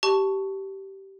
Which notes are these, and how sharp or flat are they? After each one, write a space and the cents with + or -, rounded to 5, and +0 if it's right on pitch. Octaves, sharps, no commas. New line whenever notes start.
G4 -15 A5 +0 C#6 +5